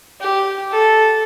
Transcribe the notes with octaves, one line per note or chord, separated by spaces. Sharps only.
G4
A4